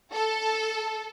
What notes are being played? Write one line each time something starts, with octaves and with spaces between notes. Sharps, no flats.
A4